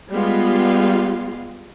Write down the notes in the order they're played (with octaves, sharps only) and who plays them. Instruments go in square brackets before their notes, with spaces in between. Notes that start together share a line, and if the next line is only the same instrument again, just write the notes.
[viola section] G3 G#3 B3 F4